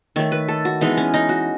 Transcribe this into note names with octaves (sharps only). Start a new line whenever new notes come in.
D#3 A3 C#5
B4
A4
F#4
E3 G#3 B3 D#4
C#4
D#4
F#4